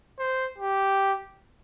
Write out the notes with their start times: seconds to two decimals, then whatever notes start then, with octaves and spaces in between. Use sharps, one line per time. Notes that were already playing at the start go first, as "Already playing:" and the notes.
0.19 C5
0.58 G4